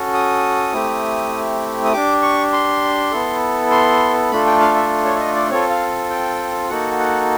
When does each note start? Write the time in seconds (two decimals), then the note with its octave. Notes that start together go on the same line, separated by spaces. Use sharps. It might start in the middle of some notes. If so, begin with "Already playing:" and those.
Already playing: C#4 F#4 A4
0.14 D#6
0.73 A3 C4 E4 G4
1.85 D#6
1.93 D4 G4 D6
2.22 C#6
2.53 C6
3.12 B3 E4 A4
3.71 C6
4.31 A3 D4 F4 A4 B5
4.46 G5
4.60 F5
4.75 E5
5.05 C#5
5.16 E5
5.20 D#5
5.36 D5
5.50 C4 F4 A4 C#5
5.70 F5
6.10 G5
6.70 A#3 D#4 F#4 A4 F#5
7.00 F#5